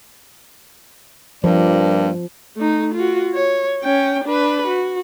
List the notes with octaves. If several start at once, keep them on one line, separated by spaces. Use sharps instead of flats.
G2 F3 A#3 D5
A3 D#4
F4 F#4
C#5
C#4 G5
D4 B4
F#4